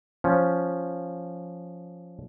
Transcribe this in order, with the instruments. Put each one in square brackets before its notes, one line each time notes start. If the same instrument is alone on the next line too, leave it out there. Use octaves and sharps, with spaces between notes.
[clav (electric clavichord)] F3 C#4